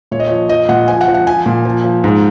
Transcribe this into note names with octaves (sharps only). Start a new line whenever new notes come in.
A#2 C#5
D#5
F3 C#5
F3 D#5
A#2 F#5
F3 G#5
F#5
F3
F#5
F3 G#5
A#2
F3
F3
G#2